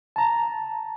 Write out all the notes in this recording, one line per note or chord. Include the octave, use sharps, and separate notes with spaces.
A5 A#5